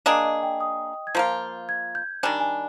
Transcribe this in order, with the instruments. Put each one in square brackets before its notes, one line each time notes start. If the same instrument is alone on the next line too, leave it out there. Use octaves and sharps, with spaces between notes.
[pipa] A#3 D4 G#4 [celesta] D#5
[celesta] D#5
G5
D#6
G#6
[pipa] F3 A#3 F4 [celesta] G6
[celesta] G#6
G6
[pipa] D#3 G3 D4 [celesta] G#5
[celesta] G#5